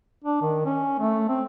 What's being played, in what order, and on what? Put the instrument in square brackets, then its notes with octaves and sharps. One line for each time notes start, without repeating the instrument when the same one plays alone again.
[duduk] D4
D#3
C#4
A3
C4